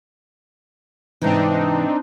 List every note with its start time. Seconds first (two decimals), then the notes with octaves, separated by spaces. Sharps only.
1.22 G#2 C3 E3 C4 D4 D#4